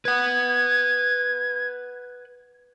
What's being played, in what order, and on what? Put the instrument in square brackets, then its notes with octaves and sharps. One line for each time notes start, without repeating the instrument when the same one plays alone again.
[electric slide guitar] B4 F#5 [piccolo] G#6